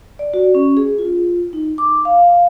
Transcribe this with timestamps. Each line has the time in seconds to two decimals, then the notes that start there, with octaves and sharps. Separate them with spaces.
0.19 D5
0.34 F#4
0.55 C#4
0.77 G#4
0.98 F4
1.53 D#4
1.78 D6
2.05 F5